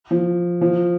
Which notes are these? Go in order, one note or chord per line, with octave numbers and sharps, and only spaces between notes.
F3
F3